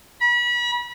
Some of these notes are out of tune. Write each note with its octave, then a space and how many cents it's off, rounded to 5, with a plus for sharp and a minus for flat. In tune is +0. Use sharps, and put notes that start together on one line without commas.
B5 -35